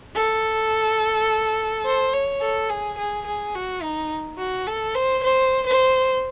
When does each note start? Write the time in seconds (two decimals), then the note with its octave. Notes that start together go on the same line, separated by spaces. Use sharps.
0.16 A4
1.85 C5
2.13 C#5
2.41 A4
2.70 G#4
2.98 G#4
3.26 G#4
3.55 F#4
3.83 D#4
4.39 F#4
4.67 A4
4.95 C5
5.23 C5
5.67 C5